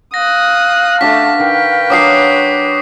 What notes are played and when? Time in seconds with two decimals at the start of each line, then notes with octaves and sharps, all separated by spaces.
0.14 F5 D#6 F#6 A#6
1.01 A3 D4 F#4 A5 B6
1.40 D#3 B4 G5
1.90 F#3 D4 F#4 D6 D#6 C7